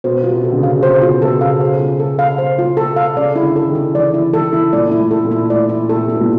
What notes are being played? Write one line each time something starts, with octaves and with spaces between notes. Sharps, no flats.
B2 C5
F4
C3
A4
D3
C#3
F5
C3 C5
B2 F4
B2 A4
C#3 F5
C5
F4
A4
F5
C5
F4
A4
F5
C#3 D5
E4
D3
A4
D#3
E4
E3 D5
E4
D#3 A4
E4
A#2 D5
E4
A2
A4
A#2
E4
A2 D5
E4
A#2 A4
C3
B2 E4
A#2